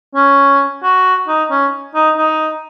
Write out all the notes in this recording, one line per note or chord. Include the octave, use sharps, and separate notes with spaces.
C#4
F#4
D#4
C#4
D#4
D#4